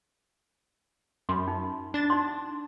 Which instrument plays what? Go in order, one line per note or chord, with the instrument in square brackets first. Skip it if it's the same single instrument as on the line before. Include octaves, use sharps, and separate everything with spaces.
[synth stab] F#2 [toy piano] B5 C6
[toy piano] D#4
[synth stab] D4 A6
[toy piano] D#4 C6